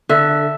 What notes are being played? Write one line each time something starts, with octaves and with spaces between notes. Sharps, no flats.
D3 E5